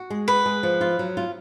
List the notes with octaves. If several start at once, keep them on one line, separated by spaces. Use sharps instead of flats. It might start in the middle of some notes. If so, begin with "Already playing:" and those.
Already playing: F#4
G#3
B3 B4
G#3
F3
F4
F#3
F4